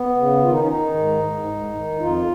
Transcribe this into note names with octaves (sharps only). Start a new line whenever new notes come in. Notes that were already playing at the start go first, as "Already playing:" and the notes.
Already playing: B3
C#3
D#3 F4
D#4
C#4
D#3 D#4
G#2
G#2
G#2
D#3
F2 F4